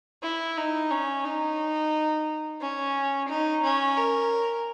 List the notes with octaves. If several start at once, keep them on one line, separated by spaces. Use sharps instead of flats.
E4
D#4
C#4
D#4
C#4
D#4
C#4
A#4